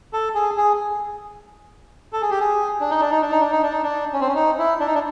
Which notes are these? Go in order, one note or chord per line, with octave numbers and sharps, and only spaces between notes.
A4
G#4
G#4
A4
G#4
G4
G#4
D4
D#4
D4
D#4
D4
D#4
D4
D#4
D4
D#4
D4
C#4
C4
C#4
D#4
E4
D4
D#4
D4